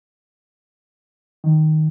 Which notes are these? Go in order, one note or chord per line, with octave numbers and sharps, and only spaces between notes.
D#3